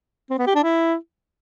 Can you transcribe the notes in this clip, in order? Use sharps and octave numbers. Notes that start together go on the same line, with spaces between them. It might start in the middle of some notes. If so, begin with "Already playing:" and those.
C4
B3
G4
D4
E4